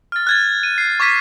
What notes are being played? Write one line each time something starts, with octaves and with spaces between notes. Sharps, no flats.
F6 A6
F#6 G#6 A6
D#7
C7
C#6 D6 G#6 B6 D#7